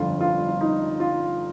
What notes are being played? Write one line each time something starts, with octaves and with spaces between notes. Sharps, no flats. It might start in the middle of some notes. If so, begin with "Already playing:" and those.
Already playing: G1 F2 D3 F3 F4
F4
F4
D#4
F4